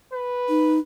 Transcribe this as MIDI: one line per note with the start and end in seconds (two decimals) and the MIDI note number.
0.13 0.80 71
0.49 0.79 63